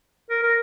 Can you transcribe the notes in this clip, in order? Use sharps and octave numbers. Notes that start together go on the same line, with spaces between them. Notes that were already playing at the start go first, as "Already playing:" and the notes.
A#4
A#4